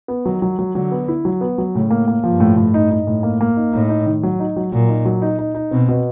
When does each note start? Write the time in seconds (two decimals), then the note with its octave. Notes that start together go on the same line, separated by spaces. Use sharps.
0.08 B3
0.25 D#3 F#3
0.42 F#3
0.59 F#3
0.75 D3 F#3
0.91 B3
1.08 E4
1.25 F#3
1.41 B3
1.58 F#3
1.75 A2 C#3
1.90 A#3
2.08 A#3
2.24 G2 F3
2.40 A2
2.57 A2
2.74 D#4
2.91 D#4
3.07 A2
3.23 A#3
3.41 A#3
3.57 D#4
3.72 A2 D#4
3.89 D#4
4.07 D#3
4.23 F#3
4.39 D#4
4.56 F#3
4.72 A#2 F#3
4.89 D#4
5.05 F#3
5.22 D#4
5.39 D#4
5.55 D#4
5.71 B2 C4
5.88 B2